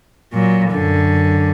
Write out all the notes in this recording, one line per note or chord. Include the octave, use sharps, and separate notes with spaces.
A#2 F#3
F#2 D3